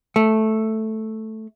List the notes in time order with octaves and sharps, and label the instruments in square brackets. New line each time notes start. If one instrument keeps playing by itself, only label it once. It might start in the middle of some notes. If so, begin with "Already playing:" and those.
[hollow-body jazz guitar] A3